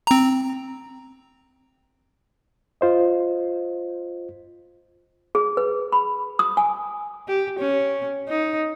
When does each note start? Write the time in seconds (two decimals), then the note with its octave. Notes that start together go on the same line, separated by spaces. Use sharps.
0.07 C4 A#5
2.81 F4 C5 D#5
5.35 G#4
5.57 B4
5.92 B5
6.39 D#6
6.57 G#5
7.28 G4
7.59 C#4
8.28 D#4